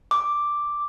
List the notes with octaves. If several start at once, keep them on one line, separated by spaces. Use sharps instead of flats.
D6